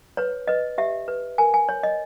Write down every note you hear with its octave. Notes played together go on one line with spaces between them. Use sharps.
B4 C#5
B4 D#5
G4 E5
B4
A#4 G#5
G#5
C#5
D#5